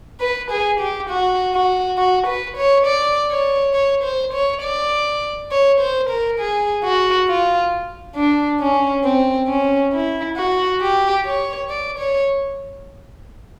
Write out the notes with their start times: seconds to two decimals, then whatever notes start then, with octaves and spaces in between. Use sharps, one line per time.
0.21 B4
0.51 G#4
0.80 G4
1.10 F#4
1.54 F#4
1.98 F#4
2.27 B4
2.57 C#5
2.86 D5
3.30 C#5
3.74 C#5
4.04 C5
4.33 C#5
4.62 D5
5.51 C#5
5.80 C5
6.10 A#4
6.39 G#4
6.84 F#4
7.28 F4
8.16 D4
8.60 C#4
9.04 C4
9.49 C#4
9.93 E4
10.37 F#4
10.81 G4
11.25 C#5
11.69 D5
11.99 C#5